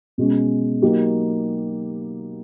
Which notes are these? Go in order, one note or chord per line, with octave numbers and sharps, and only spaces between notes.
B2 G#3 C#4
F#3 A#3 D#4 G4